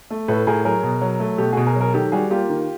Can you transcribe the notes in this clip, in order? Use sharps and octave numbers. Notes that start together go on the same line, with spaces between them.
A3
A2 A4 B4
A2 G#4 A#4
F#3 G#4 A#4
B2
F#3
A3
B2 G4 A4
B2 F#4 G#4
G#4 A#4
F#3
G#4 A#4
D#3 G4 A4
G3 F#4 G#4
A#3 F4 G4
D#3